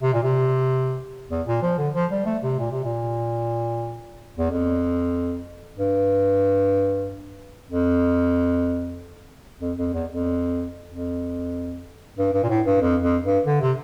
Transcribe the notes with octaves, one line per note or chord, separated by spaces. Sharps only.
C3
A#2
C3
E2
A#2
F3
D3
F3
G3
A3
C3
A#2
C3
A#2
E2
F2
G2
F2
F2
F2
E2
F2
F2
G2
G2
A#2
A2
G2
F2
F2
G2
D3
C3